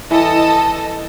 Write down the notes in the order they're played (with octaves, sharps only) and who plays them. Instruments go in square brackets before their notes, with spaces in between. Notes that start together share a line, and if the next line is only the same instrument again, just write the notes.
[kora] E3 [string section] A4 D#5 A5